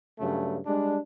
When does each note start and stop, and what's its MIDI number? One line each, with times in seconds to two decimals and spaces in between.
0.19 0.58 43
0.19 0.58 49
0.19 0.58 54
0.19 0.58 57
0.66 0.97 55
0.66 0.97 56
0.66 0.97 62